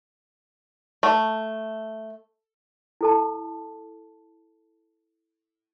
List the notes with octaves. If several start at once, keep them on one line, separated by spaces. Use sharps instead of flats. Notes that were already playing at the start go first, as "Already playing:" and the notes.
A3
E4 A4 A5